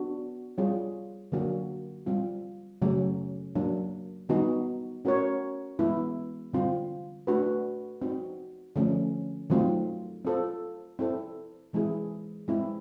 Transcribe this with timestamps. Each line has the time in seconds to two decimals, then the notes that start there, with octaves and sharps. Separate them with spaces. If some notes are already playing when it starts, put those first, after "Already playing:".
Already playing: B3 D4 F#4
0.58 G3 C4 F4 G#4 C#5
1.32 D3 F#3 A#3 D4 F#4
2.06 G3 C4 F4
2.82 C#3 F#3 A3 C#4
3.55 F#3 A#3 D4
4.29 D#3 G3 B3 D#4 F#4
5.05 A3 C#4 F#4 A#4 C#5
5.79 E3 G#3 B3 E4
6.53 D3 G3 C4 F4
7.27 A3 D4 F#4 B4
8.02 C4 D#4 F#4
8.76 D3 F3 A3 C#4
9.50 D#3 F#3 A3 C4 F4
10.25 C4 F4 A4 C5
10.99 C4 E4 A4 C5
11.73 E3 G#3 C4 E4 G#4
12.48 G#3 C4 E4